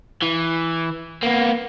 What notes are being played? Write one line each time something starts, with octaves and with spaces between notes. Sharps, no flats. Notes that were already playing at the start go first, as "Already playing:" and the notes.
E3
A#3 B3